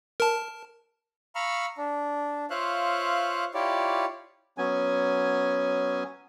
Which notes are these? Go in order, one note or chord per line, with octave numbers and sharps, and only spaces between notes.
A#4 A5
F5 A#5 B5 C#6 E6 F6
D4
F4 C5 C#5 E5 F5 F#6
E4 F4 G4 C#5 D5
F#3 B3 C#4 G#5